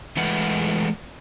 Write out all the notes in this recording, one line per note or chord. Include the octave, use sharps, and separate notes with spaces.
E3 G#3 A3 B4 F#5